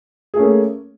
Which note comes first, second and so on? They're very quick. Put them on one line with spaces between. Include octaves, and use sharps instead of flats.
G#4 A3 C#4 A#3